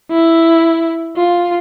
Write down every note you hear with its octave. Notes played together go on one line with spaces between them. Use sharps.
E4
F4